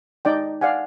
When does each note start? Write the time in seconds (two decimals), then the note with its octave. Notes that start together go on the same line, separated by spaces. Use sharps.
0.25 D#4 D5 G5
0.61 D5 F5 F#5 G#5